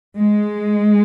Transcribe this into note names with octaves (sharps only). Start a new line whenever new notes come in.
G#3